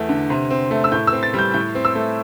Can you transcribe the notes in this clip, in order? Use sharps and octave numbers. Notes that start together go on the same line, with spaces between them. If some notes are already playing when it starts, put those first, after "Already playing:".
Already playing: E2 A3
D3
C3
C4
A3
E6
A2 G6
E6
C4
A6
G3 G6
A2 G6
C4
E6
A3